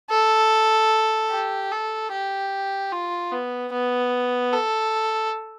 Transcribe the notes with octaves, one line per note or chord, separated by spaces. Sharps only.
A4
G4
A4
G4
F4
B3
B3
A4